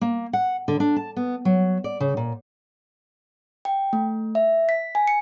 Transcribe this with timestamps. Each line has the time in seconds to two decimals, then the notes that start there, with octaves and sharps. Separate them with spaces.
0.01 A#3
0.33 F#5
0.68 D3
0.80 D4
0.96 A5
1.16 B3
1.45 F#3
1.84 D5
2.00 C#3
2.17 A#2
3.65 G5
3.93 A3
4.35 E5
4.69 B6
4.95 G#5
5.08 C#7